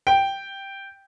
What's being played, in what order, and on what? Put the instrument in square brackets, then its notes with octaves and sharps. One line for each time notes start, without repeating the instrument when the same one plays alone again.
[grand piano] G5